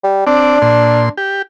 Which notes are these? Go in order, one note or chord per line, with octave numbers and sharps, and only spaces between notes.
G3
C4 D4 D5
A#2 C6
G4